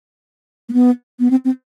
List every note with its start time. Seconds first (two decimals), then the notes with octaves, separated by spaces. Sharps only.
0.69 A#3
0.73 B3
1.20 B3
1.31 C4
1.45 C4